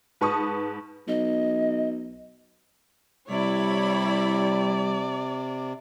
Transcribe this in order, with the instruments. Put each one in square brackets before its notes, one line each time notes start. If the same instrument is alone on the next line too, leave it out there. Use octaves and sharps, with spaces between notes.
[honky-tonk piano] G#2 B4 A5 C#6 D#6
[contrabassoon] B1 [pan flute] D#5
[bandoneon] C3 [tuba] G3 [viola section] E4 C#5 B5 [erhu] D5